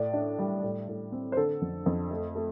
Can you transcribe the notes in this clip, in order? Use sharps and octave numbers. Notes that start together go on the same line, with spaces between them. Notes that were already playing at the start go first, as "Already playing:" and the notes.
Already playing: A2 D5
D4
G3
A2
A2
C4
C5
D3 A4
F2
F2
A3
A3